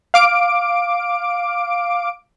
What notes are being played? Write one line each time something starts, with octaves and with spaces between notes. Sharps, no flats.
F5 D6 D7